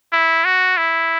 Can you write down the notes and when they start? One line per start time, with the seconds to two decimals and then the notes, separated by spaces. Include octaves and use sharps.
0.12 E4
0.45 F#4
0.77 E4